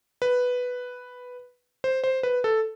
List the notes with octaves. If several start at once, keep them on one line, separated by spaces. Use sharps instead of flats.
B4
C5
C5
B4
A4